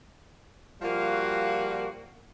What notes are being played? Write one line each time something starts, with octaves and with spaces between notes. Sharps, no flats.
F3 G3 A#3 F4 F#4